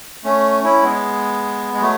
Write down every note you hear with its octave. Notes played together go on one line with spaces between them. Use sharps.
A3 C#4
C#4 E4
G#3 B3
G#3
F#3 A3